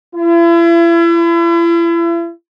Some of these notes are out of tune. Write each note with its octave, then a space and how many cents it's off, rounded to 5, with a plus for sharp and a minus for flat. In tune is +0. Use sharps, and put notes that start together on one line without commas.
E4 +40